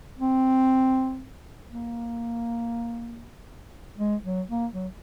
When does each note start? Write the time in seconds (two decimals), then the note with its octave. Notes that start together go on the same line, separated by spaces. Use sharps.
0.19 C4
1.70 A#3
3.98 G#3
4.24 F#3
4.49 A#3
4.74 F#3